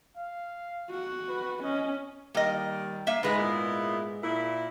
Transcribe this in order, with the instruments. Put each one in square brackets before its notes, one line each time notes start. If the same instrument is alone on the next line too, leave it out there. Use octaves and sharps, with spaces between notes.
[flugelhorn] F5
[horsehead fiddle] F#4
[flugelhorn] B4
[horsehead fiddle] C#4 [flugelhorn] D#5
[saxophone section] D#3 G3 [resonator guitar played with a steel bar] A#3 D#5
[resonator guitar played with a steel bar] A#3 E5 F5
[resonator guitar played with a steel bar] G#2 G#3 G#4 [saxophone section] B4
[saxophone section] A#2 B3 E4
A#2 E4